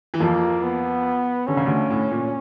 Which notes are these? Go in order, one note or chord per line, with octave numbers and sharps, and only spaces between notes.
E3
F2 F3 A#3
B3
D3 C#4
C#3
D2 D3
A2
A#2